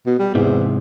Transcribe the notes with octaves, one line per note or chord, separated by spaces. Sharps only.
B2
G3
E2 G#2 C3